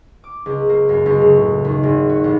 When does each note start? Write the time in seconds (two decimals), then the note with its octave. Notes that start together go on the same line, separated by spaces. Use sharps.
0.24 D6
0.46 C#2
0.69 A#3
0.89 F#2
1.06 C#2
1.21 C#3
1.36 A2
1.65 D#2
1.83 G#1
2.09 F#4
2.24 A1